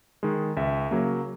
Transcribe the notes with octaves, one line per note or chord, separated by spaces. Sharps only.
D#3 G#3
C#2 E5
C#3 F#3 A#3